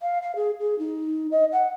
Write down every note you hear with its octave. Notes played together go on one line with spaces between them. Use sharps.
F5
F5
G#4
G#4
D#4
D#5
F#5